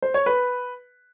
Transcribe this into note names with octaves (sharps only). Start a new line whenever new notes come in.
C5
C#5
B4